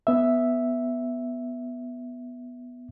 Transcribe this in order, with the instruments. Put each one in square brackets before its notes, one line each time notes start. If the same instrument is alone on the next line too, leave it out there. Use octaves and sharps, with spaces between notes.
[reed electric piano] B3 E5